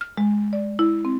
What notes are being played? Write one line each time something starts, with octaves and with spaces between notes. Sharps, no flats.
F6
G#3
D5
E4
C4